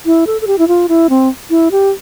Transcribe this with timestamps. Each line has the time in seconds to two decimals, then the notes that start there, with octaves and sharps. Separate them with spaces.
0.06 E4
0.27 A4
0.41 A4
0.47 G4
0.58 E4
0.68 F4
0.89 E4
1.10 C4
1.50 E4
1.71 G4